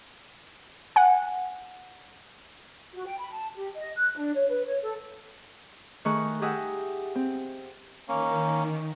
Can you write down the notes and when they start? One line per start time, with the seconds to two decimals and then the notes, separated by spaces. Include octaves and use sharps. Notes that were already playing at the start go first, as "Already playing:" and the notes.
0.96 F#5 G#5
2.93 F#4
3.05 G5
3.18 B5
3.32 A5
3.54 G4
3.76 D#5
3.96 F#6
4.16 D4
4.34 C#5
4.48 B4
4.64 C#5
4.82 A4
6.05 D#3 A3 G#4 C#6 F#6
6.41 G4 G#4 D#5 E5 F#5
7.15 C4
8.09 D#3 A#3 C#4